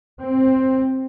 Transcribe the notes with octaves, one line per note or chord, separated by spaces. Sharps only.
C4